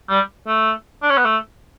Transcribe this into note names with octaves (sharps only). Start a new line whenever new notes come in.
G3
A3
D4
C#4
B3
A3